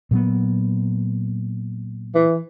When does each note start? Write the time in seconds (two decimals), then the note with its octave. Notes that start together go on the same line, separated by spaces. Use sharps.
0.11 A#2 F#3 B3
2.15 E3